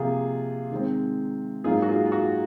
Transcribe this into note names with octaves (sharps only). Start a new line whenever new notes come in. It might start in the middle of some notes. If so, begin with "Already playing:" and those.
Already playing: C3 F3 A#3 F4 G#4
D#3 G#3 C4
G#2 F#3 A#3 D#4 F4 G#4
F#4
F4 G#4
F4
F#4